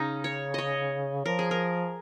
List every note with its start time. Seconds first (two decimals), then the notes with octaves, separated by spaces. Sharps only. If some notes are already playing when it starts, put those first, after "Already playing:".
Already playing: C#3 C#4 D#4
0.24 C#5
0.54 C#5 D#5
1.25 F3 A#4
1.39 G#4
1.51 A#4